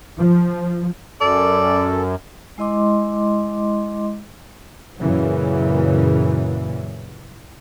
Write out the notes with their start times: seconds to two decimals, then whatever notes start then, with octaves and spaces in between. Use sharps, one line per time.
0.18 F3
1.21 F#2 A4 D5
2.58 G#3 E4 D#5 C6 D6
4.98 F#2 A#2 C#3 E3 F#3